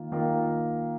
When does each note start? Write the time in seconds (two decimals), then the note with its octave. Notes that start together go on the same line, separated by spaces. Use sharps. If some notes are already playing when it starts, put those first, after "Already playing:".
Already playing: D#3 A#3 F4
0.12 D#3 A#3 F4 A#4